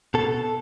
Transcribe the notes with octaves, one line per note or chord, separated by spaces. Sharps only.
B2 A4